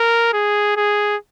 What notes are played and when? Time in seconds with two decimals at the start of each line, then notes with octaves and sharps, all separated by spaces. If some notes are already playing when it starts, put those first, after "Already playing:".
Already playing: A#4
0.33 G#4
0.77 G#4